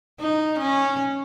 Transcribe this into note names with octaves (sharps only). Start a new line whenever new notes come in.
D#4
C#4